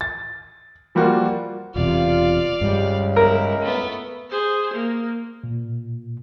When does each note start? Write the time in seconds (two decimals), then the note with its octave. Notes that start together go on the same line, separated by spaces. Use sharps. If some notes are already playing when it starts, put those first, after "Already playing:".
0.01 A6
0.95 F3 G3 A#3 F4 F#4
1.76 E1 E2 C3 F4 D5 F5
2.61 C#2 G2 G3
3.16 E4 A#4
3.62 A3 B3
4.30 G#4 C5
4.74 A#3
5.44 A#2